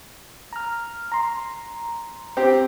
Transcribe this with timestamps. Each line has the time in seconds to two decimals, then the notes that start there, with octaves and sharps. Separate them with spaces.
0.53 A#5 F6
1.12 A#5 C6
2.37 C4 G4